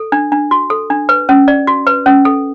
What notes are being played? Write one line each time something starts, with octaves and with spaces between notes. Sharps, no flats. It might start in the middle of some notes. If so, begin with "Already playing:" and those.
Already playing: A4
D4
D4
F#4
A4
D4
B4
C#4
D5
F#4
B4
C#4
A4